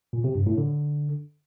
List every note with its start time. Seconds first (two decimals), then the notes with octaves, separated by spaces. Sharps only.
0.13 A#2
0.24 C3
0.35 G2
0.46 A2
0.58 D3